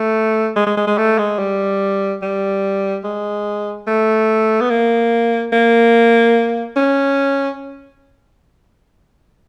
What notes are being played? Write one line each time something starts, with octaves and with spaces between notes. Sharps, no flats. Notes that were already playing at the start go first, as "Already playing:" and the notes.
Already playing: A3
G#3
G#3
G#3
G#3
A3
G#3
G3
G3
G#3
A3
B3
A#3
A#3
C#4